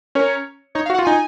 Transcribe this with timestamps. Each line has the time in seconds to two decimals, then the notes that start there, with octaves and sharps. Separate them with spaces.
0.15 C#4 A#4 C#5
0.75 D#4 C#5
0.86 F5
0.90 F#4
0.94 F#5
0.99 F4
1.05 D#4 G#5